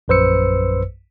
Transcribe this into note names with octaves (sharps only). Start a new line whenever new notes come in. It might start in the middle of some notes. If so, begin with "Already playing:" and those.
A#1 F#2 B4 C5 E6 C#7